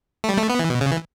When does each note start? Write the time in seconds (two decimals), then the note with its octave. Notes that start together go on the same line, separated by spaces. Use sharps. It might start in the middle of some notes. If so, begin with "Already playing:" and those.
0.24 A3
0.29 G3
0.38 A3
0.50 B3
0.59 E3
0.70 B2
0.81 C#3
0.92 E3